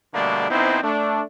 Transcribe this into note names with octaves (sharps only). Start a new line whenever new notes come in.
B2 D3 G3 A3 A#3 D4
A#1 B3 C4 D#4 E4 C5
A3 D4